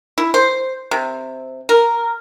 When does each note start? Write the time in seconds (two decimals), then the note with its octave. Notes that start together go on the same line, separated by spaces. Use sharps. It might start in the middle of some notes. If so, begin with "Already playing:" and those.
0.18 E4
0.34 C5
0.91 C3
1.69 A#4